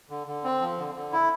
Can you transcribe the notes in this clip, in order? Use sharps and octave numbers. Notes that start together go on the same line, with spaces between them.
D3
D3
C4
F3
D3
D3
E4